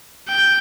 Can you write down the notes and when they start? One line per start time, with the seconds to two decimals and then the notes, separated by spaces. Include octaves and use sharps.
0.29 G5